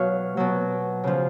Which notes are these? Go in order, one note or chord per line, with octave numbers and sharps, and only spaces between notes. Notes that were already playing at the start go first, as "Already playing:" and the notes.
Already playing: B2 F#3 C#5 F5
B2 F#3
C#3 F3